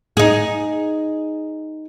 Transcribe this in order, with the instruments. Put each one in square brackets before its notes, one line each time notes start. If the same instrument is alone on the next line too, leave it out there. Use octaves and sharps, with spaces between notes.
[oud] D#4 G#4